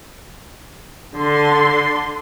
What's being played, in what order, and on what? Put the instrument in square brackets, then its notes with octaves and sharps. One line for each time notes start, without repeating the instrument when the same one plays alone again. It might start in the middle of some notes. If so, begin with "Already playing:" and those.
[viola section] D3 C6